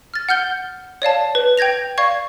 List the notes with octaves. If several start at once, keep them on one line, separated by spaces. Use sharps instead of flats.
F6 A6
F#5 F6 G6 G7
C#5 D5 F5 A5
B4
G5 G6 G#6 A#6 F7
D5 F5 C#6 G#6